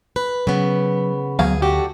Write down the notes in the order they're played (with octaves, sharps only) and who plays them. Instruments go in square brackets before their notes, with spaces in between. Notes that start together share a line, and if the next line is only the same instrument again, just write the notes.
[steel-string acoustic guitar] B4
[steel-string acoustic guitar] C#3 B3 [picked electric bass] F#3
[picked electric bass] D2 [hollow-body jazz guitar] B2 F#3 F5 [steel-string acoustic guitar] G#4
[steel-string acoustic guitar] D4 F#4 A4 [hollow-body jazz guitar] G4